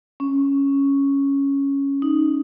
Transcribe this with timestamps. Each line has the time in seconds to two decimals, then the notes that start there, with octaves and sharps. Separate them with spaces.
0.20 C#4
2.02 D#4